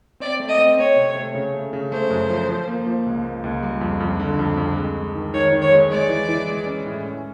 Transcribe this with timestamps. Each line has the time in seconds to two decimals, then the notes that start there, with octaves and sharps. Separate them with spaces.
0.20 C4 D5
0.40 A3
0.49 D#5
0.59 C4
0.78 C4 C#5
0.96 C3
1.15 A3
1.35 C#3
1.54 A3
1.73 C#3
1.92 A3 C5
2.10 F#2
2.30 F3
2.49 F3
2.68 A#3
2.86 F3
3.06 C#2
3.25 A#3
3.44 C#2
3.63 G3
3.81 F2
4.00 F2
4.20 D3
4.39 F2
4.57 F2
4.76 G#3
4.96 G#3
5.15 D#3
5.33 D#3 C#5
5.53 D#3
5.62 C#5
5.72 G#3
5.91 G#3 D5
6.09 E3
6.29 E3
6.48 G#3
6.66 C#4
6.86 A2
7.05 C#4